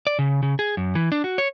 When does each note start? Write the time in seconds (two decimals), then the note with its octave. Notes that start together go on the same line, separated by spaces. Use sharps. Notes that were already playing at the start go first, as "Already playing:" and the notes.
0.07 D5
0.19 C#3
0.43 C#3
0.59 G#4
0.77 F#2
0.95 E3
1.12 D4
1.24 F#4
1.38 C#5